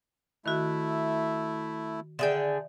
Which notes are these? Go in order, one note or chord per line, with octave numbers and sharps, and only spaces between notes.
D#3 A3 E4 F#4
D3 G#4 D5 E5 G5